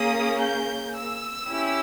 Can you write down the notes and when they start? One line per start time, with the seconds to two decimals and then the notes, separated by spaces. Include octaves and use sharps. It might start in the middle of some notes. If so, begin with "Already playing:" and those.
Already playing: A#3 C#4 G#4 D#6
0.41 G6
0.95 E6
1.50 C#4 E4 G4